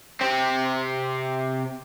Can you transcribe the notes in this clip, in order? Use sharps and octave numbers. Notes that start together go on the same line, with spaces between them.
C3 C4